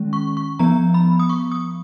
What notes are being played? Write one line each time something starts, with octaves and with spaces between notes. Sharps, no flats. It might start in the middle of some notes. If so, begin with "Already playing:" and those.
Already playing: D#3 G#3 C#4
C#6
C#6
F3 B3 A#5
B5
D#6
C#6
D#6